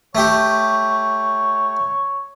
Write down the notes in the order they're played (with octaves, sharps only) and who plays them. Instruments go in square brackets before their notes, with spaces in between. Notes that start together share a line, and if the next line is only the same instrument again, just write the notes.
[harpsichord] A3 G4 [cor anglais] C#5